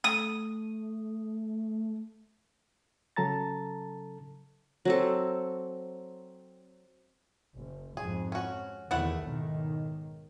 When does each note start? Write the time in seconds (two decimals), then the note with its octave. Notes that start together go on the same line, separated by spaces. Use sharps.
0.04 A3 D#6
3.16 C#3 F#3 A4 A5 A#5 A6
4.85 F#3 C4 A4
7.56 F#1
7.97 F2 G#2 G#4
8.32 C#4 F#4
8.91 E2 C3 D#3 A3 E4 F#5
9.23 B1 G#2 D#3